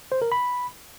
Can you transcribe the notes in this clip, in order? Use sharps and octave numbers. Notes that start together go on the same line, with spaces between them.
C5
A#4
B5